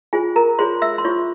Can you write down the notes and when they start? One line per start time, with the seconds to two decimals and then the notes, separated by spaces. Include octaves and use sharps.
0.13 F4 G#4 C5 G#5
0.36 A#4 A#5
0.59 F4 G#4 C5 C#5 C6
0.82 E5 E6
0.98 C6
1.05 F4 C#5 C#6
1.08 C5